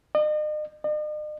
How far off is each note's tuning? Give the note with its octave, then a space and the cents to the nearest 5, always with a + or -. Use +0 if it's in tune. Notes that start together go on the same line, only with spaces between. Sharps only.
D#5 -40
D#5 -45